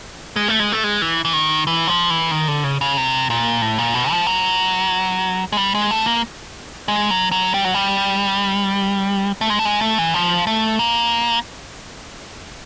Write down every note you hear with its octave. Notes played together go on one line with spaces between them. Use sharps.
G#3
A3
G#3
A3
G#3
E3
E3
D#3
E3
F3
E3
D#3
D3
C#3
C#3
C3
A#2
A2
A#2
B2
F3
F#3
G#3
G3
G#3
A3
A#3
G#3
F#3
F#3
G3
F#3
G3
A3
G#3
A3
G#3
A3
E3
F3
A3
A#3